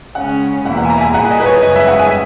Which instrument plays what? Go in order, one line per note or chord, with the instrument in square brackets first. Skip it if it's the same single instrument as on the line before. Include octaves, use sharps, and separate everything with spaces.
[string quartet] C#3 G#3 C#4 [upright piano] F#5
[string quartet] E2 B2 A#3 E4 [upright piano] F#5
[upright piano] F#5
G#5
A#5
G#5
[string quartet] A#2 A#3 E4 G#4 [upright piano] F#5
[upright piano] D#5
B4
C#5
[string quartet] F#2 C#3 G#3 [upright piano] D#5
[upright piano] E5
F#5
G#5
E5